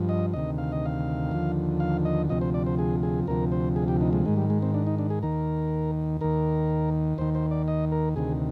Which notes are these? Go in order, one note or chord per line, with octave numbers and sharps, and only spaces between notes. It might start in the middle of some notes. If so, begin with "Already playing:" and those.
Already playing: G2 F3
D#5
D2 C3 D#3 D#5
F5
D#5
F5
D#2 D3 F3
F5
D#5
D2 C3 F3 D#5
C5
D5
C5
G#4
G#4
D2 C3 F3 A#4
C5
G#4
G4
D#4
G#3
G#2 D#3 G#3
G3
G#3
C4
D4
D#4
D4
G#4
D#2 D#3 A#4
D#2 D#3 A#4
D#2 D#3 C5
C5
D5
D#5
A#4
D2 C3 D#3 G#4